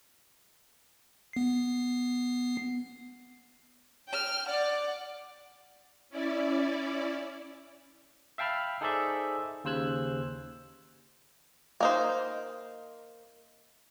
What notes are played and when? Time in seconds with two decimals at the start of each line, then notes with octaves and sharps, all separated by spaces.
1.33 B3 C7
4.08 G5 F6
4.45 D5 F#5
6.09 C#4 E4 D5
8.38 E5 F5 G5 A5 B5 F6
8.81 D#4 G#4 A4 C5 D5 E5
9.64 D#2 C#3 C5 E6 F#6 G#6
11.80 A#3 D#4 C5